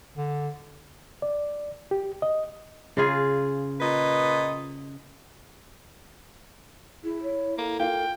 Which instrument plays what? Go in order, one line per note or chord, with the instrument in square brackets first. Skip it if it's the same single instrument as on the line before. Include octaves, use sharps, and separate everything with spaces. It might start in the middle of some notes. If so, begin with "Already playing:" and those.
[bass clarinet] D3
[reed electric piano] D5
G4
D#5
[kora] C#3 F4 G#4
[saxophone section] A#2 B4 D#5
[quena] E4 [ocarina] G#4
[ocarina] C#5
[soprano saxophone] A#3 [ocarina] A4
[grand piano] A#3 F4 [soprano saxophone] G5